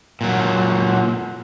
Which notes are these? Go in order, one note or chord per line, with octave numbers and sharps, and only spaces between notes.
A#2 F#3